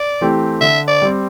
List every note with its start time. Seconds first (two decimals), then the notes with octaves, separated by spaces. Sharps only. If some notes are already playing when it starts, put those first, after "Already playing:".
Already playing: D5
0.21 E3 A3 C4 G4
0.61 D3 E5
0.88 D5
1.02 G3 C4